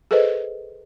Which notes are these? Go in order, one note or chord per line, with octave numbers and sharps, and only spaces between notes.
G#4 A4 B4 C5 D#5